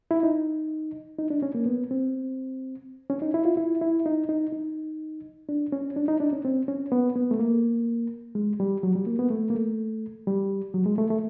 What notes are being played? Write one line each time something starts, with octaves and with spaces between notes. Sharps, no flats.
E4
D#4
D#4
D4
C#4
A#3
B3
C4
C#4
D#4
E4
F4
E4
E4
D#4
D#4
D#4
D4
C#4
D4
D#4
D4
C#4
C4
C#4
B3
B3
A3
A#3
G#3
G3
F#3
G3
A#3
B3
A3
A#3
A3
G3
F#3
G#3
A3
A3